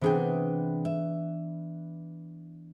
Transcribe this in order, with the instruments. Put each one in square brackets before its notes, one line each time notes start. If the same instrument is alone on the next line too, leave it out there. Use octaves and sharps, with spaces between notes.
[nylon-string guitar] C3 G#4 G5 [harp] E3 B3 D4
[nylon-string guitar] E5